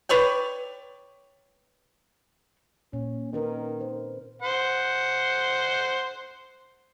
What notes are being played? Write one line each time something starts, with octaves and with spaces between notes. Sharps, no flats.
B4 C#5 D5 G5
A#2 C#4
D#3 C#4 A#4 B4
C5
C5 F#5